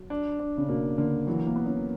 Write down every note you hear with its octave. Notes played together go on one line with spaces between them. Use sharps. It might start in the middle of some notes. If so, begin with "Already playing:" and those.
Already playing: F#3
D4
D4
C#3
B2 A#3
D3 A#3
E3 F#3
A#3
B3
C#4